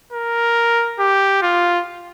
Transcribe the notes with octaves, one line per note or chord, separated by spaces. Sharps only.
A#4
G4
F4